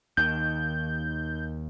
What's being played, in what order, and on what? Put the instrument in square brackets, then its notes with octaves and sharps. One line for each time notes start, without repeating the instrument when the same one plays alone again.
[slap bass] D#2 D#3 [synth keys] G6